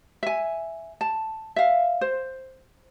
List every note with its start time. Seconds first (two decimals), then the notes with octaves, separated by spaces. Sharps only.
0.23 E5 G#5
1.01 A5
1.56 E5 F5
2.01 C5